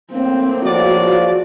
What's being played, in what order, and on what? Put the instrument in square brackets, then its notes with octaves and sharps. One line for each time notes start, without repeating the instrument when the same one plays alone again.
[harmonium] A2 A#3 [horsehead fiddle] C4
[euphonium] F3 [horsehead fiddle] F#4 [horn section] G#4 D5